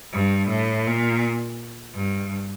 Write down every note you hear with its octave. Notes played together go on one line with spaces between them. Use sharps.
G2
A2
A#2
G2